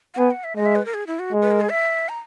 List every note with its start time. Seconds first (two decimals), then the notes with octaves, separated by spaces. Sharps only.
0.14 F#5
0.18 B3 G#5
0.31 F#5
0.44 E5
0.56 G#3 D#5
0.66 E5
0.75 B4
0.85 A#4
0.94 G#4
1.07 E4
1.19 F#4
1.33 G#3
1.42 B4
1.51 A#4
1.61 G#4
1.70 E5
2.09 A#5